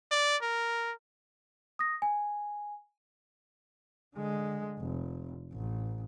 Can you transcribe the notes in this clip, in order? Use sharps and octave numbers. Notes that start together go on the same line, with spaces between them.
D5
A#4
D#6 A#6
G#5
D3 G#3
F1
A1